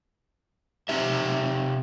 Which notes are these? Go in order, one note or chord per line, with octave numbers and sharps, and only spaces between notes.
C3 D#4 G4 E5